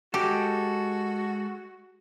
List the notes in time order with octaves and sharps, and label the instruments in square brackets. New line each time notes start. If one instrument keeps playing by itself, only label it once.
[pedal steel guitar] G#3 A4 [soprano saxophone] F#4 [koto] G4